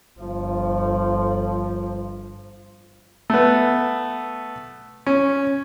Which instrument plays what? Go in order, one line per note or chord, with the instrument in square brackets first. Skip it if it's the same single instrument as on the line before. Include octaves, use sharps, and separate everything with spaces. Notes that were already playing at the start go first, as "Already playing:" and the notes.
[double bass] G1 F3
[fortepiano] A3 B3
C#4